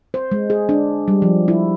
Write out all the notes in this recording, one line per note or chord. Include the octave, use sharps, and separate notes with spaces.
C5
G#3
G#4
D4
G3
F3
E4